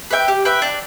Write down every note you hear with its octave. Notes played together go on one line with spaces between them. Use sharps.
B4 E5 G5
G4
B4 E5 G5
D4